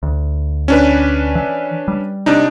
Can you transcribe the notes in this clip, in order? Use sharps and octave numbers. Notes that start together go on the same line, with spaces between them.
D2
C#4 D4 B4
E3
G3
C3 D4 D#4